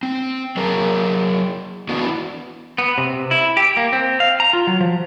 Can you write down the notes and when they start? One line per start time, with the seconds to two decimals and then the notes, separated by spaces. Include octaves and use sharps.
0.03 C4
0.57 F#3 G#4 A#4 A#5
1.89 E3 B3 D4 E4 F#4 B4
2.78 B3
2.98 C3
3.31 E4
3.57 G4
3.77 A#3
3.93 C4
4.20 F5
4.40 A#5
4.53 F4
4.67 F#3
4.81 F3